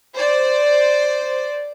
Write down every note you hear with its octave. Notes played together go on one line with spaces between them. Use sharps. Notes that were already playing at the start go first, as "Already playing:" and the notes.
C5 D5